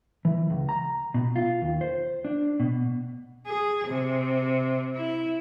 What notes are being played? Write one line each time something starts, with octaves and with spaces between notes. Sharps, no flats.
E3
C#2
A#5
B2
F4
D#2
C5
D4
B2
G#4
C3
E4